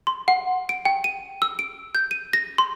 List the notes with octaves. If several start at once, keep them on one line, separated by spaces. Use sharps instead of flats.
C6
F#5
D7
G5
D#7
E6
D7
G6
D#7
A#6
C6